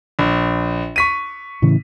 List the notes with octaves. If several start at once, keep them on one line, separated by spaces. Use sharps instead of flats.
A#1
C#6 B6 D#7
A2 C#3 E3